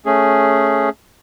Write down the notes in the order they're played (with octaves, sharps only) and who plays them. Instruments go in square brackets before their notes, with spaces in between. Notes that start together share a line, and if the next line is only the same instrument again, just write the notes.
[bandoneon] A3 C#4 G#4